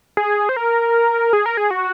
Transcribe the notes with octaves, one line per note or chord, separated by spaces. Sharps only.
G#4
C5
A#4
G#4
A#4
G#4
F#4